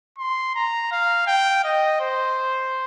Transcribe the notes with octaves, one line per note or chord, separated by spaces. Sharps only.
C6
A#5
F5
G5
D#5
C5